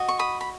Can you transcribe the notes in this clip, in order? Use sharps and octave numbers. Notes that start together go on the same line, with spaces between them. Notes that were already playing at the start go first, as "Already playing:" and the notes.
Already playing: F#4 D#5
C#6
B5 D#6
B5